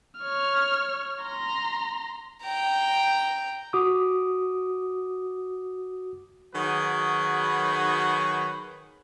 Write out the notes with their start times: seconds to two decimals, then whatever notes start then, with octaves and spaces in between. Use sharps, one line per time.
0.19 C#5 F6
1.23 A#5 C6
2.43 G5 A#5
3.73 F#4 D6 D#6
6.54 D#3 F#3 F#4 G#4 B4